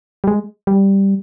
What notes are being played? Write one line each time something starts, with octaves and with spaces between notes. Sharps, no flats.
G3
G#3
G3